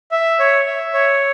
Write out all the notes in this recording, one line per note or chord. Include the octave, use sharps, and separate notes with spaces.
E5
C#5
E5
C#5